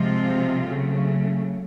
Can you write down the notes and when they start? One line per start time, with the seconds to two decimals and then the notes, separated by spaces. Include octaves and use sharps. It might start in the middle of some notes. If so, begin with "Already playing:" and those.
Already playing: C3 F3 G#3 C4 F4
0.65 C#3 F#3 A3